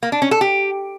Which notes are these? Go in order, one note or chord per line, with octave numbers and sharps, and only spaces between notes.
A#3
D4
C#4
A4
G4